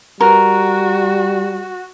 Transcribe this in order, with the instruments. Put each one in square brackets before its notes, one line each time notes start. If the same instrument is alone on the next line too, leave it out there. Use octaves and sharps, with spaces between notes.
[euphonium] G3 [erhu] F#4 [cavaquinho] A#4